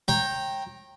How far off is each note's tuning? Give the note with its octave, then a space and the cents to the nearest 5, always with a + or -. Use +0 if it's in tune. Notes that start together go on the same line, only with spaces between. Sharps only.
C#5 -35 G5 +0 A#5 +0